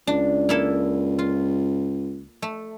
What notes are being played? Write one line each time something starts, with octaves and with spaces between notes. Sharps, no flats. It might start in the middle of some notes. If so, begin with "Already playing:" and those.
C#2 D4
A#3 E4 A4
F4
A3